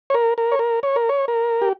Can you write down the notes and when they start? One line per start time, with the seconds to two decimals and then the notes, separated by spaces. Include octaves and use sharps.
0.10 C#5
0.14 A#4
0.38 A#4
0.52 C#5
0.59 A#4
0.83 C#5
0.96 A#4
1.09 C#5
1.28 A#4
1.62 G4